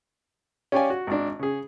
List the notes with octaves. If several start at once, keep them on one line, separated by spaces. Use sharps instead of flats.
C#4 G4 C#5 D5 F5 G#5
F#4
G#1 D4
C#3 G#4